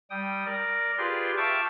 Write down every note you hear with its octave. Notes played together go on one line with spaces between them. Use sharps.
G3 G5 D#6
A#4 D5
F4 G4 G#4 B4 D5 C6
E5 F5 G5 A5 C#6 D6